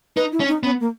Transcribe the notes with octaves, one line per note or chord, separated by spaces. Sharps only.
D#4 B4
E4
C#4
D#4
B3 C#4
A#3